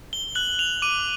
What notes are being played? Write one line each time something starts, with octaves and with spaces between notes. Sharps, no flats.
G7
F#6 F#7
F7
D6 D#7